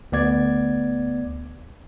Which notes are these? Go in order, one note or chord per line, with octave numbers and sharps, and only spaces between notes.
D2 B3 D5 G#6